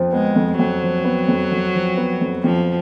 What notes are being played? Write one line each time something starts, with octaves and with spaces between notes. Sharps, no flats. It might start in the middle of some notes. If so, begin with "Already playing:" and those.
Already playing: F2 F3
G#3 B3
F2
F2 F#3
F3
B3
F2
F2
F3
B3
F2
F2 F3